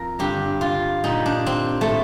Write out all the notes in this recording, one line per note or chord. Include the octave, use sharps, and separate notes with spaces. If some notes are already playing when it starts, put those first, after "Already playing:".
Already playing: F2 F3 A#4
G2 D3 G3 G4
F4
A#2 G3 D#4
D4
C4
A3
A2